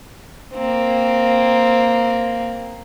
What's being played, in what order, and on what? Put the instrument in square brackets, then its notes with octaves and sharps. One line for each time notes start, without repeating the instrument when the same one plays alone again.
[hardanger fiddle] A#3 C4